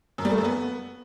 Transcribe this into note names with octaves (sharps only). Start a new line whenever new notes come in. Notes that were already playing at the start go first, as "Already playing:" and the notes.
F#2
G3
A3
F#2
B3